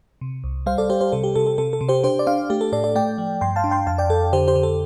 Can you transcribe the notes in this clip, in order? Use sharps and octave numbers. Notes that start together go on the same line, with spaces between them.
C3
C2
G3 C5 F5
A4 D5
G3 G4 C5
G4 C5
C3 A4
G4
C3 A4
A4
C3 A4
A4
C3
G4 C5
D4 G4 C5
D5
D4 C5 F5
A3 G4
A4
A2 A4 D5
A4 D5
A3 D5 G5
F3
G2 G5 C6
F5 A5
D4
G5 C6
F2 F5 A5
D5 G5
F2 A4
D3 G4 C5
G4 C5
D3
A4